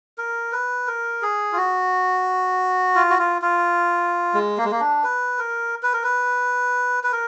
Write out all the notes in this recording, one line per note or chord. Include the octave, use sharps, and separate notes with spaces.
A#4
B4
A#4
G#4
F4
F#4
F4
F#4
F4
F4
G#3
A#3
G#3
A#3
D4
B4
A#4
B4
A#4
B4
B4
A#4